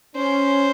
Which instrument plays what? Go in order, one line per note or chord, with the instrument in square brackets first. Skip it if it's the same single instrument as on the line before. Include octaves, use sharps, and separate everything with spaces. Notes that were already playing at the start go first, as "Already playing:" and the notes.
[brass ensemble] C#4 [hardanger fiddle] C5